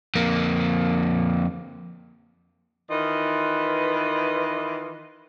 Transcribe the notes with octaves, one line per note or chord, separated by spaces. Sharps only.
F2 A#3
D#3 E3 F4 B4 D#5